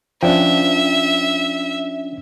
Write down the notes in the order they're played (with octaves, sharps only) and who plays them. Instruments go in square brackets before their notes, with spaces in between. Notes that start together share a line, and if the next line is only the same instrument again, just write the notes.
[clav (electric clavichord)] F3 [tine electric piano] C#4 D4 G5 [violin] E5